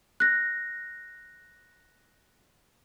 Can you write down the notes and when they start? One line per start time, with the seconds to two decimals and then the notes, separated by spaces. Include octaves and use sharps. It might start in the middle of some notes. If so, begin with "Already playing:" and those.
0.20 F#6 A#6